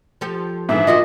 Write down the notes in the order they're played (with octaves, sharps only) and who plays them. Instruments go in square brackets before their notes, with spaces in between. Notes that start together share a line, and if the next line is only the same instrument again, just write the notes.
[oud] F3 G4 A4
[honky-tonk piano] G#2 D3 E3 [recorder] E5
[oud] A#3 F4 F#4 [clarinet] D#5